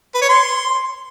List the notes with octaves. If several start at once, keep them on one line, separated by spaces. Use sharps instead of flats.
B4
C#5
C6